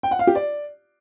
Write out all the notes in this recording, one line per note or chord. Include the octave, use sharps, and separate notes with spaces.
G5
F#5
F5
G4
D5